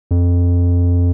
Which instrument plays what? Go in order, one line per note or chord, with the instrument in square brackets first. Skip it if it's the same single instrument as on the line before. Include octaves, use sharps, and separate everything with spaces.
[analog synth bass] F2